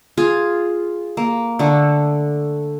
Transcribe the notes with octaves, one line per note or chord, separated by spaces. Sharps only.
F4 G#4 G#5
A#3
D3 A3